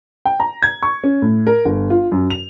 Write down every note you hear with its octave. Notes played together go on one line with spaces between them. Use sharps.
G5
A#5
G#6
C#6
C#4
A2
A#4
G1
F4
F#2
F7